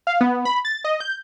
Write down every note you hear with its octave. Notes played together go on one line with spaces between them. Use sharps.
F5
B3
B5
A6
D#5
G6